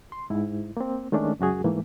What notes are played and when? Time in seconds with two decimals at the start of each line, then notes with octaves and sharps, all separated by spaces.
0.12 C6
0.30 G#2 E4
0.77 A#3 C4
1.12 D#3 G#3 A3 C#4 D4
1.39 C#2 F#2 F#4 G#4
1.64 G#2 E3 A3 A#3